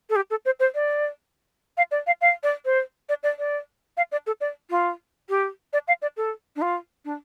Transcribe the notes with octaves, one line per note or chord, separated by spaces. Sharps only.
A4
G4
A4
C5
C5
D5
F5
D5
F5
F5
D5
C5
D5
D5
D5
F5
D5
A4
D5
F4
G4
D5
F5
D5
A4
D4
F4
D4